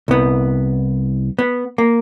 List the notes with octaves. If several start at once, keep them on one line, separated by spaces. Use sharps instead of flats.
C2 B3
B3
A#3